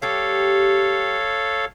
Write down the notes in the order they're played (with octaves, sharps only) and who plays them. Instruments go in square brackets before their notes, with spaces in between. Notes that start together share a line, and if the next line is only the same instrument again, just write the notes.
[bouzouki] G3 G4 [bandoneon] A4 C#5 F5